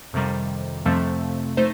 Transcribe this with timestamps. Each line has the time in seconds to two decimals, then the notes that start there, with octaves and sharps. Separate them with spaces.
0.13 F2 C3 D#3 G3
0.86 F2 C3 F3 A3 C4
1.57 A3 D#4 C5